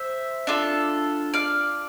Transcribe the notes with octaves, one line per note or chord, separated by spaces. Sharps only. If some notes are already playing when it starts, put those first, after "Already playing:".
Already playing: C5 E5
D4 F4 A4
D5 F5